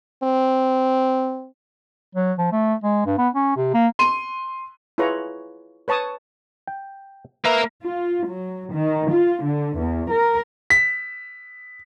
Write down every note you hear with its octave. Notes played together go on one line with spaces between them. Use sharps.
C4
F#3
F3
A3
G#3
G2
B3
C#4
C3
A#3
C6 D#7
E4 F4 G#4 B4 C#5 A#5
B4 C#5 A5 C#6 D#6
G5
A#3 A#4 B4 E5
F4
F#3
D#3
F4
D3
E2
A#4
B6